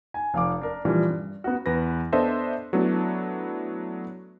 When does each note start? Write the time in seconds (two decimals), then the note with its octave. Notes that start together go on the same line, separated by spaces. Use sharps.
0.14 G#5
0.34 F1 F5 D6
0.62 D4 A#4
0.85 A#2 E3 F3 G3
1.09 G2
1.44 B3 F#4
1.66 E2 B4 A#6
2.13 B3 D4 A4 C5 D#5 E5
2.73 F#3 A3 B3 D4 E4 F#4